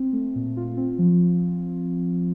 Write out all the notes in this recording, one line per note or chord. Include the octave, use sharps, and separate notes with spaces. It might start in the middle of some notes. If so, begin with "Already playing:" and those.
Already playing: C4
A3
A#2
F4
C4
F3